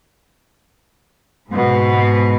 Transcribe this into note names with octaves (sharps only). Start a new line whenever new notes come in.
G#2 B2